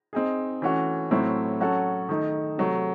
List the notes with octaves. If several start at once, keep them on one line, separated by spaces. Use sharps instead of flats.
C4 D#4 G#4
E3 A3 C#4 F#4
A2 F#3 A3 C4 E4
F#3 C#4 F#4 A4
D#3 A3 D#4
C3 F#3 A3